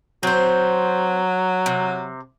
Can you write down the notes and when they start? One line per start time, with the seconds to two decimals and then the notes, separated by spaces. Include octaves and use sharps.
0.23 F#3 C4 C5
1.66 C3